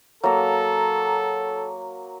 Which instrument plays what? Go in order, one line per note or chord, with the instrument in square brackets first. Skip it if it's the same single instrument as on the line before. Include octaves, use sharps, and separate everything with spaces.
[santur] F#3 A#3 A#5 [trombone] A4